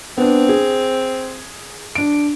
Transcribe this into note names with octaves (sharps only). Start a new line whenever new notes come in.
B3 C4 D4
G#4
D4 D7